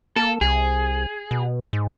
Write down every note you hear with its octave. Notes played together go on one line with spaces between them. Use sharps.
A#3 A4
C2 G#4
B2
G#2